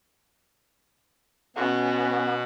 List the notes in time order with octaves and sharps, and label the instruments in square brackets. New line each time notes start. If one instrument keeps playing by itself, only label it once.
[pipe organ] B2 F#4 [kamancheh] B3 C#4